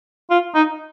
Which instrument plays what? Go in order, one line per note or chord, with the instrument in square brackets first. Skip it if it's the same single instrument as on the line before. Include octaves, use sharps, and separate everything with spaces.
[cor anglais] F4
D#4